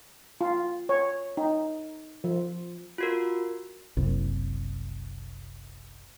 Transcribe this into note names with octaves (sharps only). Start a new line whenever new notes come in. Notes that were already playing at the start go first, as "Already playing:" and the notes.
F4
C#5
D#4
F3
F4 F#4 A#4
F#1 C2